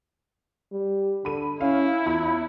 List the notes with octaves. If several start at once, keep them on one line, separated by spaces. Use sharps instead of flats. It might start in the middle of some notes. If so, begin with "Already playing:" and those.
G3
D3 B5 D#7
C#4 E4 F5
E2 F4 B5